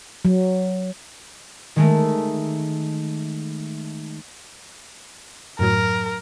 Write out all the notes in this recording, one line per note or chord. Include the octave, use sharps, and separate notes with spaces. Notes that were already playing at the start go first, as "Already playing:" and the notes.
F#3
D#3 G#3 A3
F#2 A2 F#3 A#4